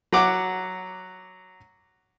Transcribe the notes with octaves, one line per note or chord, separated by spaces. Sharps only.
F#3 F#5 D6